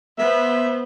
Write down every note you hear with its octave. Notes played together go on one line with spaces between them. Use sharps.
B3 C5 E5